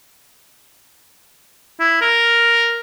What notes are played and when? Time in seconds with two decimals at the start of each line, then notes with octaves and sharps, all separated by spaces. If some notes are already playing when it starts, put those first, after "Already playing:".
1.80 E4
2.01 A#4